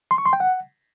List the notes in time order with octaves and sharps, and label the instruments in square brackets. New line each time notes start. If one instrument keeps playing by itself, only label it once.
[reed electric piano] C6
C#6
C6
G5
F#5